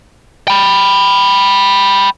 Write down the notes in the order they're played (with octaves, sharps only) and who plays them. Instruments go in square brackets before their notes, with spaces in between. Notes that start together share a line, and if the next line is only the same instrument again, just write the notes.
[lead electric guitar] G5 B5